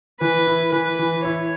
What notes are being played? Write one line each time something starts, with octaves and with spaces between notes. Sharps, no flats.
E3 B4
E4
E3 B4
E3
E4 C#5